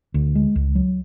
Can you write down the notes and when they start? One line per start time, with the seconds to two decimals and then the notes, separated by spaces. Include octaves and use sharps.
0.14 D2
0.35 G#3
0.56 C#2
0.75 F#3